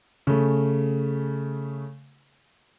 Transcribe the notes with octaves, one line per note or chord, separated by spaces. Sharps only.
C#3 A3